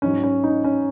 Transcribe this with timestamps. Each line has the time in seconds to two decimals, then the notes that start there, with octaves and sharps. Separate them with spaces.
0.02 G#2 F#3 C#4
0.24 C#4
0.44 D#4
0.64 C#4